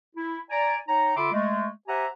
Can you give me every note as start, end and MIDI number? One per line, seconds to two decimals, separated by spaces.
0.15 0.38 64
0.49 0.76 74
0.49 0.76 80
0.49 0.76 82
0.88 1.12 63
0.88 1.12 73
0.88 1.12 79
0.88 1.12 82
1.16 1.32 50
1.16 1.32 65
1.16 1.32 76
1.16 1.32 83
1.16 1.32 84
1.16 1.32 86
1.32 1.68 56
1.32 1.68 57
1.88 2.06 67
1.88 2.06 72
1.88 2.06 76
1.88 2.06 78
1.88 2.06 80
1.88 2.06 82